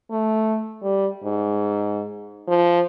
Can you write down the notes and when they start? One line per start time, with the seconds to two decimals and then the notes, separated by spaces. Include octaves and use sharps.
0.11 A3
0.83 G3
1.24 G#2
2.48 F3